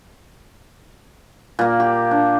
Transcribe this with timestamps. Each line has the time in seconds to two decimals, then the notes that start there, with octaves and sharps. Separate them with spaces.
1.59 A#2 A#3
1.80 G4
2.11 D4